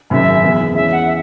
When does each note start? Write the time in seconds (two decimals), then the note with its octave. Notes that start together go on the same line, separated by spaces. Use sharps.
0.10 G#1 F#2 C#3 E5
0.43 F#1 E2 E3 B3 G#4
0.75 E2 E3 G#3 C#4 E5
0.92 F#5
1.07 E5